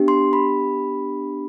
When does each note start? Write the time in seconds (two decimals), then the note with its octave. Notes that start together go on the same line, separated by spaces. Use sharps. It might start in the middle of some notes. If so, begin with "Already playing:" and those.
Already playing: B3 D4 G4
0.08 C6
0.33 B5